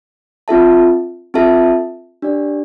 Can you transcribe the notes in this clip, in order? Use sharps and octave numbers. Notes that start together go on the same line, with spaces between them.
C4 F4 A4 E5 A5
C4 F4 A4 E5 A5
D4 G4 D5